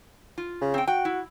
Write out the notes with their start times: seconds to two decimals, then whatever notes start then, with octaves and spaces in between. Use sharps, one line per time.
0.38 F4
0.61 C#3
0.74 C4 G5
0.87 F#4 G5
1.05 E4